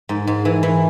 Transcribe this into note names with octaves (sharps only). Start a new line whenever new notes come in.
G#2
G#2
E3
E3